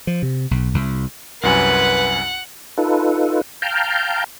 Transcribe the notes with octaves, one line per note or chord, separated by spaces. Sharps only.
F3
C3
B1
C2
C2 F#2 B4 F#5 G#5
D#4 F4 A4 B4
F5 G5 A5 A#5 F6 G6